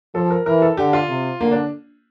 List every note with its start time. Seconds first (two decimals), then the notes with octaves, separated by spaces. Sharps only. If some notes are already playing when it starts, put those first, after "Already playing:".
0.15 F3 A4
0.30 A#4
0.46 E3 A#4
0.62 A4
0.77 D3 G4
0.93 F4
1.09 C3
1.40 D3 A#3
1.51 D4